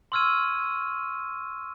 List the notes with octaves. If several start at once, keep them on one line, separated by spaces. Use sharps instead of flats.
C6 C#6 E6 F6 G#6 D#7